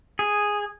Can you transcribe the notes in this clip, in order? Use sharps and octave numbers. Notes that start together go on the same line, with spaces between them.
G#4